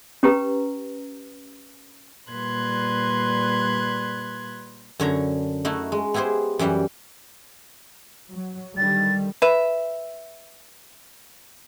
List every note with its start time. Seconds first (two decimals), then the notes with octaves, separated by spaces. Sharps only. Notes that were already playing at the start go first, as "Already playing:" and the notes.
0.23 C#4 G4 B4 A#5
2.30 A#2 G3 B4 C6 F#6 G#6
5.00 F#2 D3 C#5 A#5
5.65 A3 D#4 E4 F#4
5.92 G#3
6.14 B3 E4 G4 G#4 C5
6.59 F#2 E3 G3 G4 F#5
8.33 F#3
8.77 D3 D#3 G3 A6
9.42 B4 E5